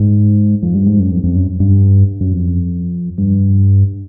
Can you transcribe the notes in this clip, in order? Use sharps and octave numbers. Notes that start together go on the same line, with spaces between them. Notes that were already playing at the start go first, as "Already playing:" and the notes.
Already playing: G#2
F2
G2
G#2
F#2
F2
F2
F#2
G2
F#2
F2
G2